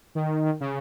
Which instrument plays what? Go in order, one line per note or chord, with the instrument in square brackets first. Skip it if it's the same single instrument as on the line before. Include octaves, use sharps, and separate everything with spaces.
[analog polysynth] D#3
D#3
C#3